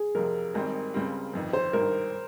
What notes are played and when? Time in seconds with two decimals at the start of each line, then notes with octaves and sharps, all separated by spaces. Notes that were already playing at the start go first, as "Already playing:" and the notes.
Already playing: G#4
0.15 F2 C3 F3 A#4
0.54 G#1 G#2 D#3 G3 C4 A#4
0.94 C#2 C#3 G3 C4
1.33 G1 F2 D#3
1.53 C5
1.73 G#1 G2 D#3 A#4